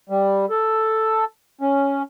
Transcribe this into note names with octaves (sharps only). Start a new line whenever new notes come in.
G3
A4
C#4